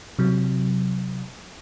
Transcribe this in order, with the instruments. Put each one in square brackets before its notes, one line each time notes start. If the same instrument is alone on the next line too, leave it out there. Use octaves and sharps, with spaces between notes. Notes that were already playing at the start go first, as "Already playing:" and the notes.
[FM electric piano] C3 F#3